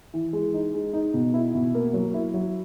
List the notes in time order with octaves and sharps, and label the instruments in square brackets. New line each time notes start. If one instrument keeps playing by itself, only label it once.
[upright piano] E3
G#3
D#4
G#3
D#4
B2
E4
B2
A#3
F#3
E4
F#3